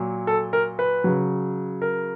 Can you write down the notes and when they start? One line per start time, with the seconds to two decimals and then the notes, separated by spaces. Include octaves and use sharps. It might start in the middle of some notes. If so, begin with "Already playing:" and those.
Already playing: A#2 F#3
0.27 A4
0.53 A#4
0.79 B4
1.04 C#3 F#3
1.82 A#4